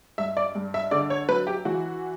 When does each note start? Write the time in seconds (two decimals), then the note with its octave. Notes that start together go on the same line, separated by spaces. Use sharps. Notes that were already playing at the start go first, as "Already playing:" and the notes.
0.18 G2 E5
0.37 D5
0.55 G2
0.74 E5
0.91 D3 D5
1.10 C#5
1.29 F#3 B4
1.47 G4
1.65 E3 F#4